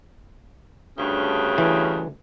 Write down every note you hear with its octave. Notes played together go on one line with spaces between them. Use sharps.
D2 G2 C#3
E3